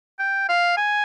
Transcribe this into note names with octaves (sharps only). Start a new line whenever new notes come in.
G5
F5
G#5